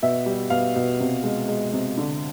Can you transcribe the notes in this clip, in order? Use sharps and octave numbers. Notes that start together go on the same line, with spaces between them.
B2 E5
G3
B2 F5
B2
C3
G#3
G#3
C3
D3